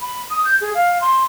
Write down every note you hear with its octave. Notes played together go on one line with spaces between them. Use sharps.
B5
D#6
G6
G#4
F5
C6